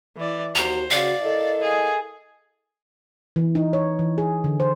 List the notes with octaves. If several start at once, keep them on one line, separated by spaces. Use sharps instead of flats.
E3 D5
D#2 F#4 C5 A#5
C#3 F#4 D5 F5
E4 A4 A#4 D#5
G#4
E3
D#4
C#5
E3
G#4
D3
C5